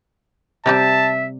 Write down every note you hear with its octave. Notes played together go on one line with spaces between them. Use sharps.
C3 G3 G4 E5 A5